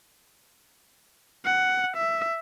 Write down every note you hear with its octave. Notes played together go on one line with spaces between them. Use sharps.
F#5
E5